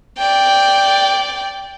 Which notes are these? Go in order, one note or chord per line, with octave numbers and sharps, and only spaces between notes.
D5 G5